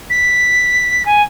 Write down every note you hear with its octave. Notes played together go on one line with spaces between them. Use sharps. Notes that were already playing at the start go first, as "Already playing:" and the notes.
B6
G#5